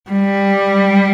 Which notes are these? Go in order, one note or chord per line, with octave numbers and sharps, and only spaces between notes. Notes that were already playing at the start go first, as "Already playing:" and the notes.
G3